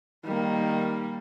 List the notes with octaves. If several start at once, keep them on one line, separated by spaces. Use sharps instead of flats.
D#3 G3 A#3